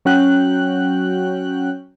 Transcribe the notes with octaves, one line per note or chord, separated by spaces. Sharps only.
F#3 C#4 F#4 G5 F#6